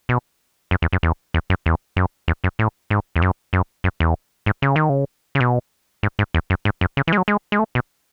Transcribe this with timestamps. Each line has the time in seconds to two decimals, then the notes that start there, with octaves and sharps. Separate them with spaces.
0.09 B2
0.71 F#2
0.82 E2
0.93 F#2
1.03 E2
1.34 E2
1.50 F#2
1.66 E2
1.96 F#2
2.28 E2
2.44 F#2
2.59 A2
2.90 G#2
3.16 E2
3.22 F#2
3.53 F#2
3.84 F#2
4.00 E2
4.46 G#2
4.62 C#3
4.76 D#3
4.90 C#3
5.35 C#3
5.40 B2
6.03 G#2
6.19 G#2
6.34 E2
6.50 F#2
6.65 G#2
6.81 F#2
6.97 C#3
7.07 E3
7.13 G#3
7.18 F#3
7.28 G#3
7.52 G#3
7.59 A3
7.75 B2